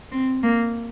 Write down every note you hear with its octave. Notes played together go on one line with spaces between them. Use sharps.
C4
A#3